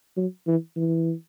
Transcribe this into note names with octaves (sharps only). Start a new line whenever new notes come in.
F#3
E3
E3